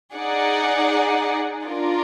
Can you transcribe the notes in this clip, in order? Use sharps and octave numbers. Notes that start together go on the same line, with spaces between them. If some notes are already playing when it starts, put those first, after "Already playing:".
D#4 G#4 D5 F#5
D4 F4 A#4 D5